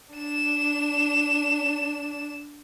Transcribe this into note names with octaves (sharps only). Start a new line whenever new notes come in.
D4 E7